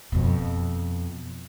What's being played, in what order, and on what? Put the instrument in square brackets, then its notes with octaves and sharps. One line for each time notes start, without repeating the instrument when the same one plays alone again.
[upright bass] F2 B2